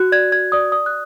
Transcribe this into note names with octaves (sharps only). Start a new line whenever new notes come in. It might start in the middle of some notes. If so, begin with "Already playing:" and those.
Already playing: F#4 F#6
D5 G#6
D5 G#6
D5 D#6
D5 D#6
F#6